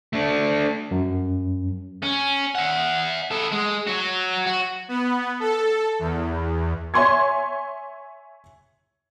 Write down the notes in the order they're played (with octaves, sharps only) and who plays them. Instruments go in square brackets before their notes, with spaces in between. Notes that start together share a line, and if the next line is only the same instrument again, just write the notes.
[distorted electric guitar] A3 D4
[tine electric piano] F#2
[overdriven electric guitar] C#4
E5 F#5
B3 A4
G#3
F#3 F#4
F#4
[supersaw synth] B3
A4
E2
[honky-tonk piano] C#5 E5 G#5 C6 C#6 G#6